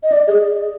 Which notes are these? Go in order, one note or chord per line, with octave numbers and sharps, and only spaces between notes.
D#5
D5
G#4